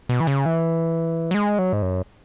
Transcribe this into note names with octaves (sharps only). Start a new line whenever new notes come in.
B2
E3
C#3
E3
F#3
G#3
F#3
G#2
F#2